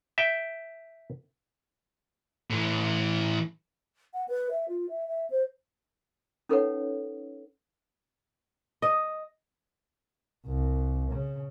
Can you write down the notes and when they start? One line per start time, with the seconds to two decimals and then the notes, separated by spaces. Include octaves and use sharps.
0.18 E5 G5
2.50 A2 E3
4.14 F#5
4.28 B4
4.51 E5
4.68 F4
4.89 E5
5.07 E5
5.30 C5
6.49 C#4 D#4 A4 B4 C#5 F#5
8.82 D#5
10.46 C2
11.11 C#3